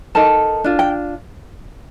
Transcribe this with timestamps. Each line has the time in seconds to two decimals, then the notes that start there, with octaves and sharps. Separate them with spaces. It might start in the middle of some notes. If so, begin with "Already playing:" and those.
0.15 D#4 A4 A#4 A5
0.64 D4 F4
0.79 G5